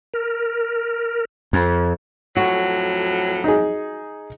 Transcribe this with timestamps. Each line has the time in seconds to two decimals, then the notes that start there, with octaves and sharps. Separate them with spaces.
0.14 A#4
1.53 F2
2.37 F2 A2 F#3 F#4
3.44 D#4 G#4